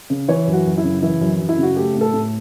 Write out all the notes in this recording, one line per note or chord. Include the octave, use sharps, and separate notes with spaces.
C#3
E3 C#5
F#2
F#4
F#2
E4
C#3
E3 E4
F#2
F#2
E4
C#3 F#4
A3 G4
A2
A4
A2